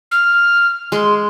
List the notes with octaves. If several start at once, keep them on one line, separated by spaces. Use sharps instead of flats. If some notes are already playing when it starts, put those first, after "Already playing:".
F6
G#3 C6